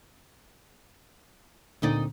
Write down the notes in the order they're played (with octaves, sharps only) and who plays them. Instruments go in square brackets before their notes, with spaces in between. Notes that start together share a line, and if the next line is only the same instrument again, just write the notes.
[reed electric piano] D2 D3 C4 [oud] A#2 D#4 D5